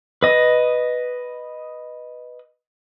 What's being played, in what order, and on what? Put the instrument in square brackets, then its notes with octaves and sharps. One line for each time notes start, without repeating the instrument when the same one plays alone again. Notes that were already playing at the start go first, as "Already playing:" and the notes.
[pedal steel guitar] B4 D#5 D#6